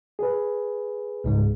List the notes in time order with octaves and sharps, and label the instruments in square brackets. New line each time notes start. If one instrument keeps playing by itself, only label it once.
[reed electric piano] G#4 B4
[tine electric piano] C#2 G#2 G#3